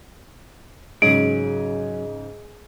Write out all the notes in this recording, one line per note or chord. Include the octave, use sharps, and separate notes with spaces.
G#2 C#3 F#3 C#4 G#4 D7